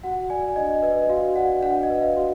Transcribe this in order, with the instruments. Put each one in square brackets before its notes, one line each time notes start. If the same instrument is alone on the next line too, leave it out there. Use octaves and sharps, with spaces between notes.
[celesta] F#4 F#5
D5 G#5
D4 D#5
B4 D#5
F#4 F5
D5 F#5
D4 F#5
D#5
B4
F5
F#4